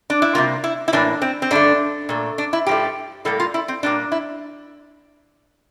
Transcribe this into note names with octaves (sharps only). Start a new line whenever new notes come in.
D4
E4
C3 G3 A#3 F4
E4
E4
A2 E3 A#3 D4
C4
C4
G2 D3 A3 D4
A#2 A3
D4
E4
G2 F3 A3 G4
A2 G3 A#3 A4
F4
E4
C4
A#2 G3 A#3 D4
E4